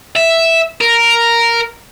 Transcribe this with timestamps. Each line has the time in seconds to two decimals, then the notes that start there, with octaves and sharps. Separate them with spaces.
0.16 E5
0.81 A#4